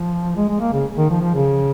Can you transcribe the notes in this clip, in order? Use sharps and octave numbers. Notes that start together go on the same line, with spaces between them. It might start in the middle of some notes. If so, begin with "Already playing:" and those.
Already playing: F3
G#3
G#3
A#3
C#3
D#3
F3
F3
C#3